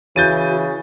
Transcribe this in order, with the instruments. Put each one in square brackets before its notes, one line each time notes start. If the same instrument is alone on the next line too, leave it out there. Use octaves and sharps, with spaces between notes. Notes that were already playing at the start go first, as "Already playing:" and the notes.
[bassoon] C#3 [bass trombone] E3 [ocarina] F#4 [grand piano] G6 A6 D#7